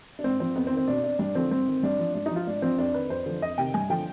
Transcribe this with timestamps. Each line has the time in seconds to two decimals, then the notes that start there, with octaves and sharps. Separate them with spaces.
0.19 D4
0.24 G#2 C4
0.40 F3 C4
0.56 F2 B3
0.67 C4
0.71 D#3
0.77 C4
0.88 B2 D4
1.04 D4
1.19 G2 D4
1.35 D3 F3 C4
1.51 G2 C4
1.67 D#3
1.83 G2 D4
1.99 F3
2.15 G#2 D4
2.26 D#4
2.31 F3
2.36 F4
2.47 G#2 D4
2.62 F3 C4
2.78 F2 D4
2.94 D#3 B4
3.10 F2 C5
3.26 D3 F3
3.42 F2 D#5
3.58 C3 D#3 G5
3.74 G2 G#5
3.90 D3 F3 G5